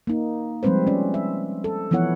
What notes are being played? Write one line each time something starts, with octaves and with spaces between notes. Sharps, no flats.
A#3 D#4
F3 G3 G#3 C4 B4 C5
C#4 D5
E5
A4
E3 F3 B3 E4 C#5 F#5